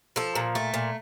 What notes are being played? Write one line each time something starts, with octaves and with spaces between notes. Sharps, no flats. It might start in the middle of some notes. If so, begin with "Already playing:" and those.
F3 A4
A#2
A3
A#2